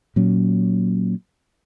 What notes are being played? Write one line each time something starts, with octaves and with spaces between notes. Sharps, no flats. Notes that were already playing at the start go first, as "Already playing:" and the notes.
A#2 F#3 C#4